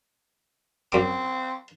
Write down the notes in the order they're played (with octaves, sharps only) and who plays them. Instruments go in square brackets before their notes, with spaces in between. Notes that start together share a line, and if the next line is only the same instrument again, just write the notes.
[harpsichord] F#2 D6 [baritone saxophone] C4